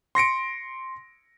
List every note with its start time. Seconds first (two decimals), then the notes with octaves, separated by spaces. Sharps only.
0.15 C6 A#6 C#7 D7